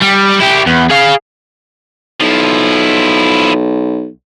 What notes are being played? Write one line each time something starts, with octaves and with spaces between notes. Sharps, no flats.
G3
E4 G4
E2
G#4 F5
B1 F3 E4